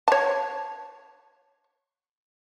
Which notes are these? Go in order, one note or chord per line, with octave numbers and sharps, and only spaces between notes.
C#5 A5